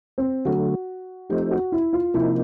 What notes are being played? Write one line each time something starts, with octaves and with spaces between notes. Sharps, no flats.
C4
D3 F#3 A3 F#4
F3 A3 C4 D#4 G4
F#4
E4
F4
C3 F3 A#3 D#4 E4